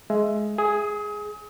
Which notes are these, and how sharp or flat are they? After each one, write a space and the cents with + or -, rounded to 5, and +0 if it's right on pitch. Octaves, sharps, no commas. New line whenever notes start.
G#3 +15 E5 +15
G#4 +0 D#6 +35